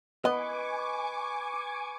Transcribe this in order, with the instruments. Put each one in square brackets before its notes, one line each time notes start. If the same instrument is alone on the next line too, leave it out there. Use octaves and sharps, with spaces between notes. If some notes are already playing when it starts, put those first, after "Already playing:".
[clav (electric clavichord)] B3 [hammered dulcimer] B4 [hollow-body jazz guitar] D#5 [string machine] G#5 C#6 D6